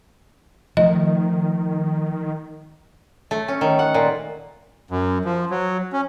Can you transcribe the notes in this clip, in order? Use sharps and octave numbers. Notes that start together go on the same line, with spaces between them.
D#3 F3 A3 D#5
A3
C#4
D#3
F#5
A#2
F#2
F3
F#3
C#4